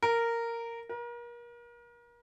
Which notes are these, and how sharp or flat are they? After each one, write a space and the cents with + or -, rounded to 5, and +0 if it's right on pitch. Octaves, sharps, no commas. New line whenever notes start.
A#4 -10
A#4 +35